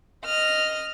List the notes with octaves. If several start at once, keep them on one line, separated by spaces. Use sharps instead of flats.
D#5 F6